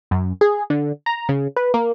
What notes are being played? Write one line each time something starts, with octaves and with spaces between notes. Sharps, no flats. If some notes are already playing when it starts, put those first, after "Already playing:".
F#2
G#4
D3
A#5
C#3
B4
A#3